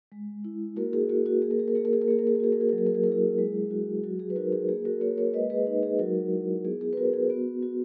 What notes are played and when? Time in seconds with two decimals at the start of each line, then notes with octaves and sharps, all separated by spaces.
0.12 G#3
0.44 E4
0.76 A#3 F#4 A#4
0.93 G#4
1.09 A#3 F#4
1.26 F#4
1.42 A#3 G#4
1.51 A#4
1.59 G#4
1.68 A#4
1.75 A#3 G#4
1.85 A#4
1.93 G#4
2.01 A#4
2.08 A#3 G#4
2.19 A#4
2.27 G#4
2.35 A#4
2.40 F#4 G#4
2.52 A#4
2.61 G#4
2.69 F#3 A#4
2.78 G#4
2.86 A#4
2.95 G#4
3.03 E4 A#4
3.12 G#4
3.38 G#3
3.71 F#4
4.03 F#3 F#4
4.19 G#4
4.30 B4
4.36 D#4 F#4 A#4
4.52 G#4
4.69 A#3 G#4
4.85 F#4 A#4
5.01 A#3 A#4 C#5
5.17 A#4 C#5
5.34 G#3 B4 D#5
5.50 G#4 B4
5.67 D#4
5.83 G#4
5.99 F#3 F#4 A#4
6.32 E4
6.65 B3 G#4
6.81 G#4
6.93 B4
6.97 B3 F#4 A#4
7.14 G#4
7.30 B3 F#4
7.63 F#4